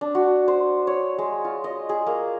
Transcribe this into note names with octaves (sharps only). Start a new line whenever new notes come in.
D4
F#4
C5
C#5
G#3
F4
D#5
G#4
A#3